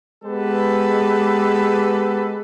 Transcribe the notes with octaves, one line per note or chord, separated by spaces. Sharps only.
G#3 B3 G4 A4 B4